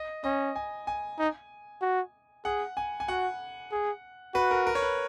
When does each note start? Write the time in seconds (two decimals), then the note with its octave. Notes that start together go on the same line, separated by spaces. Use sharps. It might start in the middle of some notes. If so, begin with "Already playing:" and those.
Already playing: D#5
0.24 C#4 D#5
0.56 G#5
0.87 G#5
1.19 D#4
1.82 F#4
2.45 G#4 F#5
2.77 G#5
3.00 G#5
3.08 F#4 F#5
3.72 G#4
4.34 F#4 B4
4.51 A#4
4.67 A#4
4.75 C#5
4.82 B4